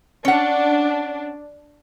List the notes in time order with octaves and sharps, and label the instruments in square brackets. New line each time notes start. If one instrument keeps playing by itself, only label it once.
[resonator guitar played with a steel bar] C#4 F#5 [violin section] D4